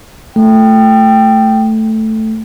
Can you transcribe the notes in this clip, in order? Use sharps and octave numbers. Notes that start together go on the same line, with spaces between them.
A3 G5